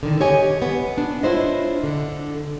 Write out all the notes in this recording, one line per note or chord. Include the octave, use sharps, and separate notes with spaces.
D3 D#3
G4 C#5 D#5 G#5
B3
D4
D4 E4 F4 C5 C#5 D#5
D3 D4